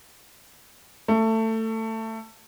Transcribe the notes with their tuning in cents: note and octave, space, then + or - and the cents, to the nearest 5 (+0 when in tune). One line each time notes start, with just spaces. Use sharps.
A3 +20